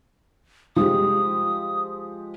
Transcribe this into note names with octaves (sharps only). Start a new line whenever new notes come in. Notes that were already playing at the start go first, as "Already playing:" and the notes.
F3 G#3 G4 D#6